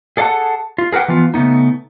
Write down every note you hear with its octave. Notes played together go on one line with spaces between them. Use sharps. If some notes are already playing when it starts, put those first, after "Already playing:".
G#4 A4 D5 F5 F#5 A5
F4
G#4 A#4 B4 F#5 G5
E3 F3 B3 F4
C#3 A3 B3 D#4